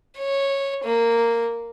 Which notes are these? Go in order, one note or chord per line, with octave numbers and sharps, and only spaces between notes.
C#5
A#3